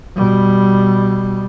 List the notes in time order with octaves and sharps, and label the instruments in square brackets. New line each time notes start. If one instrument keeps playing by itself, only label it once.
[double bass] B2 G3